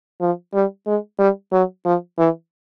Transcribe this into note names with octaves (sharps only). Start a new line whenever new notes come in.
F3
G3
G#3
G3
F#3
F3
E3